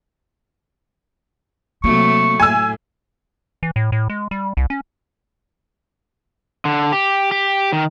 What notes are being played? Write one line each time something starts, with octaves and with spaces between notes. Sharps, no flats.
C3 F#3 A3 A#3 C#6
A2 G#5 E6
E3
A2
A2
G#3
G3
C2
C#4
D3
G4
G4
D#3